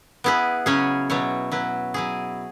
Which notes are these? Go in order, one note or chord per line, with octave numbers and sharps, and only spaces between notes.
B3 E4 G#4 B4
C#3 F#3 C#4 G#4 C#5
B2 F#3 E4 C#5
F#3 E4 B4
F#3 E4 G#4